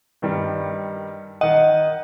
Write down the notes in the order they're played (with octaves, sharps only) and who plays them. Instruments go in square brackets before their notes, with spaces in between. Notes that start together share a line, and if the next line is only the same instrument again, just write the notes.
[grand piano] G2 D#3 G3
[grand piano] D#3 F#5 [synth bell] D#5